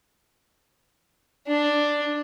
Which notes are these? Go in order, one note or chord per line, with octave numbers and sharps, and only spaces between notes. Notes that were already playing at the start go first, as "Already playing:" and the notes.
D4